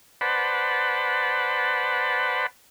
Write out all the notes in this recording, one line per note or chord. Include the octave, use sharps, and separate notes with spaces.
B4 C5 D5 F#5 A5 B5